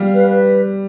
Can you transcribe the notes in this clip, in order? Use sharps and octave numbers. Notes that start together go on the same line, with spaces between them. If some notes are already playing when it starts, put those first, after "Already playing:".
Already playing: G3 F5
B4
B4